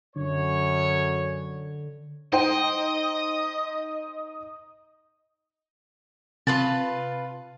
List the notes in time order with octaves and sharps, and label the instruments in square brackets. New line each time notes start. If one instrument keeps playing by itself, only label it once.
[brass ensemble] F#2 C#5 [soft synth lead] D3
[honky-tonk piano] D#4 C5 G5 [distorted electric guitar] D#5
[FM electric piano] C3 [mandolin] F4 B4 A5